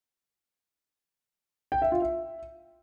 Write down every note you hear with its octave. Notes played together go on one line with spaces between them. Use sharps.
G5
E5
F4
E5